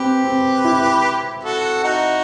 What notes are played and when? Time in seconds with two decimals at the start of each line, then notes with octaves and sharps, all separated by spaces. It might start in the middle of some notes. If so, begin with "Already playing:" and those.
Already playing: C4 G4 B4
0.24 C4
0.65 E4
1.43 F#4 A4
1.84 D#4 F#4